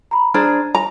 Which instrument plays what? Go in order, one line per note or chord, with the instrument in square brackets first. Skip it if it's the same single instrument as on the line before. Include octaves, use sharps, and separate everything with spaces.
[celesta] A#5 B5
[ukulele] D4 G#4 C5 [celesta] A#5 F6
[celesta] G#5 [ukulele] A#5